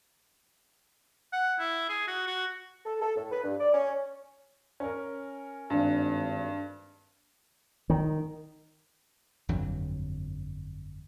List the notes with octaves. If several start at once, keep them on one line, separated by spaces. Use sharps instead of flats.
F#5
E4
G#4
F#4
F#4
A4
A4
A2
B4
G2
D5
C#4
C#4 A#4
G#1 G2
D#3
G1 F2 D3 F#3